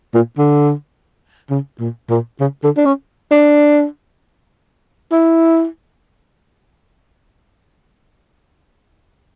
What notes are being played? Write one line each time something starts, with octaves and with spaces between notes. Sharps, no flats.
A#2
D3
C#3
A#2
A#2
C#3
D3
D4
C#4
D4
E4